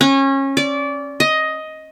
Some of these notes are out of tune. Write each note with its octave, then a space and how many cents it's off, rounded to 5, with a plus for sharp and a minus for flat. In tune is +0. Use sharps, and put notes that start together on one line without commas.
C#4 -25
D5 -25
D#5 +10